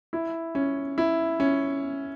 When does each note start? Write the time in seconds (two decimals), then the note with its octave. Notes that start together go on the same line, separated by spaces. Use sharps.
0.13 E4
0.55 C#4
0.98 E4
1.40 C#4